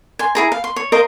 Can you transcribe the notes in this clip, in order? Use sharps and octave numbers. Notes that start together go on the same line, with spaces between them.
G#5 C6
E4 G#4 A#5
F5
C6
C#5
A#4 C5 D#5 F5